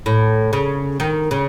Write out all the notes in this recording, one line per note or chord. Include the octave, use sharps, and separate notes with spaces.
A2
C#3
D#3
C#3